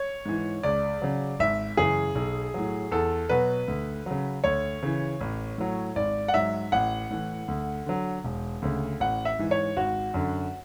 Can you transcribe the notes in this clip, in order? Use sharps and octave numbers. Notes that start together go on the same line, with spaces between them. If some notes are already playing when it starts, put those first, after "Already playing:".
Already playing: C#5
G#2 E3
C#2 D5
C#3 F#3
G#1 E5
F#2 C#3 E3 G#4
B1
A2 F#3
E2 A4
B2 F#3 B4
D2
C#3 F#3
D2 C#5
C#3 E3
A1
A2 F#3
G#1 D5
F#5
G#2 F#3 E5
A1 F#5
A2 E3
D2
D3 F#3
E1
D2 C#3
A1 F#5
E5
G#2 E3
C#5
G#1 F#4
F#2 D3